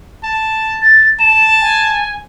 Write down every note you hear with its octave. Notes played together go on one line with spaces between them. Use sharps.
A5
A6
A5 E7
G#5